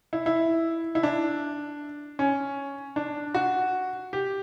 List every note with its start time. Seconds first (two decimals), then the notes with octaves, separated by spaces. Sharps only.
0.13 E4
0.26 E4
0.95 E4
1.03 D4
2.19 C#4
2.96 D4
3.35 F#4
4.13 G4